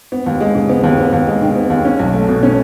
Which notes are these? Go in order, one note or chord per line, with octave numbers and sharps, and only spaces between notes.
B3
D#2
G#3
C#3
B3
D#2
B3
D#2
G#3
D#3
B3
D#2
C#4
B1
A3
B2
C#4